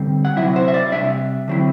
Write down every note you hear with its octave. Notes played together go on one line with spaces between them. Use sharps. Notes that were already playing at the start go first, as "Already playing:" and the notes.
Already playing: D3 G3 C4
F#5
C3 F#3 C4 E4 E5
C5
E5
D5
C3 G3 D4 E5
D3 F#3 C4 E4